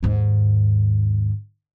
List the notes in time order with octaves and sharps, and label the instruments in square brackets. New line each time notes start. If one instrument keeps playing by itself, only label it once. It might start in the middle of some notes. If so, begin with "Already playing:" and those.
[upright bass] D#2 G#2